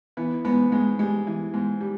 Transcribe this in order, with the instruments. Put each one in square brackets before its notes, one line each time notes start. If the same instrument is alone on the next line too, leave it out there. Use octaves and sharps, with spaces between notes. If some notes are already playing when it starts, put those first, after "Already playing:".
[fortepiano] E3 B3
G#2 B3
G#2 G#3
G3 G#3
E3
G#2
G3